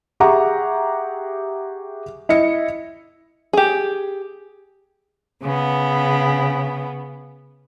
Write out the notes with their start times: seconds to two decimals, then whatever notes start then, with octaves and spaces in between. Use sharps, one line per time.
0.20 G4 G#4 E5 F#5 A#5 C#6
2.29 E4 D#5 C#7
3.53 G4 G#4
5.42 C#3 B3